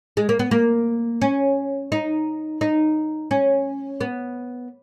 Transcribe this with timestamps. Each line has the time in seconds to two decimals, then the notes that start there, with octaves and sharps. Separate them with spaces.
0.17 G#3
0.29 A#3
0.39 B3
0.51 A#3
1.22 C#4
1.92 D#4
2.61 D#4
3.31 C#4
4.01 B3